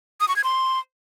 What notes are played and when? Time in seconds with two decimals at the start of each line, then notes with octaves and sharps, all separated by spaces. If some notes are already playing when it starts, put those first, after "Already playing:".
0.20 D#6
0.28 C#6
0.36 G#6
0.44 C6